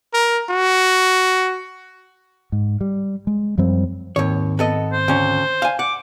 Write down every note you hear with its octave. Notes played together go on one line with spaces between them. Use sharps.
A#4
F#4
G#2
G3
G#3
F#2 F3 G3 C4
D#2 G#2 D#3 C4 C#5
B3 A4 D#5
C5
D2 C#4
F5 G#5
F#5 D6